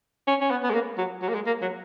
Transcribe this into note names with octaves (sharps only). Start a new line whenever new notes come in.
C#4
C#4
B3
B3
G#3
A#3
F#3
F#3
A#3
G#3
A#3
F#3